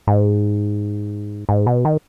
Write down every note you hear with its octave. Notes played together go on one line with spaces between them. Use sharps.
G#2
G#2
B2
D#3